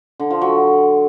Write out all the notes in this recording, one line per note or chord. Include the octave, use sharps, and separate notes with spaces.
D3
F3
F#3